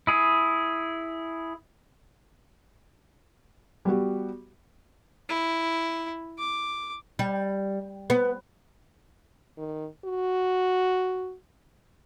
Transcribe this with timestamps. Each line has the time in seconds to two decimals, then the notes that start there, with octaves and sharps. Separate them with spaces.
0.07 E4 G#4
3.85 G3 B3 F#4 G4
5.29 E4
6.38 D6
7.19 G3
8.10 B3
9.58 D#3
10.05 F#4